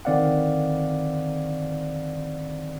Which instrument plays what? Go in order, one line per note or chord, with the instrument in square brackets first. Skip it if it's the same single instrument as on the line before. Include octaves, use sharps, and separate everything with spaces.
[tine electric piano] D3 D#3 C4 D5 F5 F#5